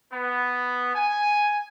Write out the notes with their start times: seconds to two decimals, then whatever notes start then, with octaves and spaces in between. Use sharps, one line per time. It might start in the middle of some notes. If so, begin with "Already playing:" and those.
0.11 B3
0.94 G#5